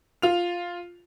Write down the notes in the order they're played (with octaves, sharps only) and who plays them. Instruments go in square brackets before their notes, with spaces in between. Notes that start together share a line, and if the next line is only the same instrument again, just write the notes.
[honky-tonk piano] F4 F7